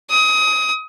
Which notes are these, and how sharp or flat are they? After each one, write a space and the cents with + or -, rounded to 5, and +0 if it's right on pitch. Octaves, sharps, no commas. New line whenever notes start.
D#6 +25